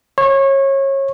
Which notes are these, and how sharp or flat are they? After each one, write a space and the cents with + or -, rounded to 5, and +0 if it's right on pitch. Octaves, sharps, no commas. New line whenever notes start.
C#5 -25